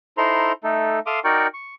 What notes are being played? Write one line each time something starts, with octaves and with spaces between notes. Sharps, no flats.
D#4 E4 A4 C5 A#5 C6
A3 D#4 A4
A4 E5 F5 C6 D6 D#6
D#4 F#4 A#4 D5 G5 C#6
C#6